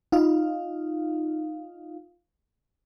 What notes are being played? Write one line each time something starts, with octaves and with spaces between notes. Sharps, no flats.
D#4 F4 F5